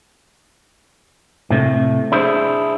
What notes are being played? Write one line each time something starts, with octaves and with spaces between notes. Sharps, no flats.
A2 C3 A3
D4 E4 G#4 C5